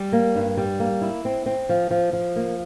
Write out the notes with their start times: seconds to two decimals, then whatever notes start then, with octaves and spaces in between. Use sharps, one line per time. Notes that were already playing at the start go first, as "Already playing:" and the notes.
Already playing: G3
0.12 A#3
0.36 G2
0.57 G3
0.80 A#3
1.01 E4
1.25 C4
1.46 C4
1.69 F3
1.90 F3
2.13 F3
2.36 A#3